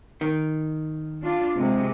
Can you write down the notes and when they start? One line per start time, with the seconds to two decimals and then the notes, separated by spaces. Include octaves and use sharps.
0.21 D#3
1.22 D4 F4
1.55 C3 G#3